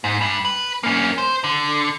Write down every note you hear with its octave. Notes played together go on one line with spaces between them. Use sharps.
G#2
G2
B4
A#3 C#4
C5
D3